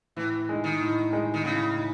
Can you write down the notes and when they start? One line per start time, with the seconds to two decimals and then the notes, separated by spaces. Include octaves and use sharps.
0.16 A2 E3
0.49 G#3 D#4
0.64 D#3
0.81 A2
1.12 G#3 D#4
1.34 D#3
1.44 A2 C#3
1.76 D#4